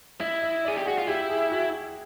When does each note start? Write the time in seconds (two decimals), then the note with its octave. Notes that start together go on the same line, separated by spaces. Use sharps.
0.20 E4 D#5
0.42 D#5
0.65 G#4 D5
0.78 G4
0.85 F#4 G#4
0.98 F4
1.07 E4 G4
1.30 G#4
1.52 F#4